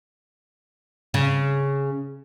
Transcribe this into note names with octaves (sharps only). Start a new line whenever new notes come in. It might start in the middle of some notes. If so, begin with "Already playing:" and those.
C#3